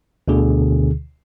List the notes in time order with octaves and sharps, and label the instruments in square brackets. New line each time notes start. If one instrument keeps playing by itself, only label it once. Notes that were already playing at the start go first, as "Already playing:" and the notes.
[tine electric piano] D2 B2 D3 G#4